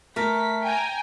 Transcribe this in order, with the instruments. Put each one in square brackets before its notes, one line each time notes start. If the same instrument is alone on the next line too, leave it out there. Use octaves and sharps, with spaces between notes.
[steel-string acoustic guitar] A3 A#4 [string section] B6
[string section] G5 G#5 A#5